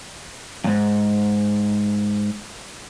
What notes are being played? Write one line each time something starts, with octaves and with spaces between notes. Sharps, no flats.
F2 G#2